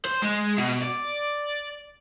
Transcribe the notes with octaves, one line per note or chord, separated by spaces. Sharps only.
C5
G#3
B2
D5